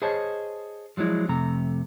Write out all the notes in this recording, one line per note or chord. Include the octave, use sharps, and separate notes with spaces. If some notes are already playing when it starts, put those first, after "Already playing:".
G#4 C5 C#5 D#5 A5
F3 F#3 G#3 E4 D5
F2 C3 A3 A#5